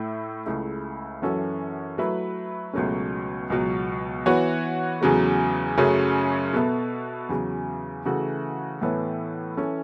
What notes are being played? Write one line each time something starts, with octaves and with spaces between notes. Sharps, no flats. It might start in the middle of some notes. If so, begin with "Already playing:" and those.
Already playing: A2 A3 E4
C#2 C#3 A3 E4
F#2 E3 C#4 F#4 A4
F#3 A3 E4 B4 E5
C#2 B2 F#3 A3 C#4
C#2 B2 F#3
E3 B3 F#4 C#5
E2 C#3 F#3 A3
F#2 C#3 F#3 A3 C#4
B2 B3 A4 E5
E2 C#3 F#3
C#3 E3 A3 F#4 A4
A2 E3 B3 A4 C#5
E3 C#4 A4